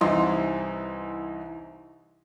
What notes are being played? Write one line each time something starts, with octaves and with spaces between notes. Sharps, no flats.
C2 E3 D#4 C6